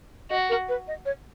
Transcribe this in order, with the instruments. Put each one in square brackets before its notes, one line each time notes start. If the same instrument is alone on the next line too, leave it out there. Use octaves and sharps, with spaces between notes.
[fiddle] F#4 [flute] D#5
[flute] A#4
B4
D#5
C#5